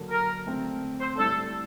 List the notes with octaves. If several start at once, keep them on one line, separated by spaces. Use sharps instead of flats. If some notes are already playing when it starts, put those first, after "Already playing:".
Already playing: D3 F#3 A#3 F#4
A#4
D3 A3 C4
C5
A2 G3 D4 A4